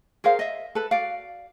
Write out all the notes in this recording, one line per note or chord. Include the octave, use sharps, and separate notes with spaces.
G#4 A#4 C5 F5
D#5 E5
A4 B4
F#4 D5 F5